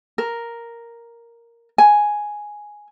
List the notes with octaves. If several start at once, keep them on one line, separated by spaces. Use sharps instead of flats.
A#4
G#5